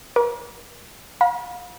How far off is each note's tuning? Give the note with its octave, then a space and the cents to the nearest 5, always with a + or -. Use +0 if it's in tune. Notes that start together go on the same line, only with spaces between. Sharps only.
A#4 +40 D6 -25
F5 +35 B5 -45